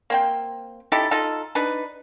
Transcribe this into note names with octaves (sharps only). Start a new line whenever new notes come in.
A#3 C4 G5
D#4 E4 G4 A4
D#4 F4 A4
D4 D#4 B4